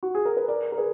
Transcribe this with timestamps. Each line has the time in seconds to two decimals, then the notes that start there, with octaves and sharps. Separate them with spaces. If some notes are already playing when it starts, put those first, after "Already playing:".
0.03 F#4
0.15 G#4
0.25 A#4
0.37 B4
0.48 A#4 D5
0.72 A#4
0.78 G#4 B4